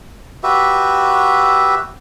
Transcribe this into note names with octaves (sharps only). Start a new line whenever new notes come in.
F#4 G4 B4 E5